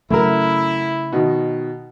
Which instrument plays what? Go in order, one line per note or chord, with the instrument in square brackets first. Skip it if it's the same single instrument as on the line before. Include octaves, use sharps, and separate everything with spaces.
[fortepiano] F#2 A#4 [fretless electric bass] C#3 A3 [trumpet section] E4
[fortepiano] B2 D#3